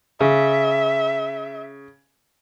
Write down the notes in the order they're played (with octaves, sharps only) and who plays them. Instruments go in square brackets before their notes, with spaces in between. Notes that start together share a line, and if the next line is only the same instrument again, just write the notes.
[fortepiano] C#3 [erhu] E5